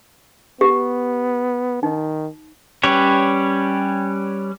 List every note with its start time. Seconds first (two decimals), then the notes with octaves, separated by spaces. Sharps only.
0.61 B3 G4
1.83 D#3 D#4
2.83 G3 C#4 G4 B4 C#5